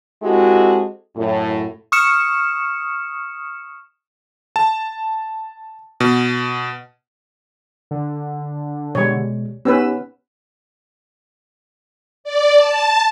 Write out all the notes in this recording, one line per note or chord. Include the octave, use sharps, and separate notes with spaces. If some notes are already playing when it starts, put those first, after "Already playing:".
G#3 C4 E4 F#4 G4 A4
F#2 A2
C#6 D#6 F6 C#7 E7
A5
B2
D3
B2 G3 G#3 C#5
B3 C#4 D#4 G4 B4 E6
D5
A5